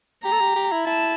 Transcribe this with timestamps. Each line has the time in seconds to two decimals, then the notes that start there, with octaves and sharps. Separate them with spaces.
0.24 G4 A#5
0.32 A4
0.40 G4
0.56 G4
0.72 E4
0.87 E4 A5